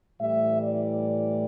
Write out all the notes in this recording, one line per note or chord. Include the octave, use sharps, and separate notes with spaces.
A2 E3 G3 E5
D5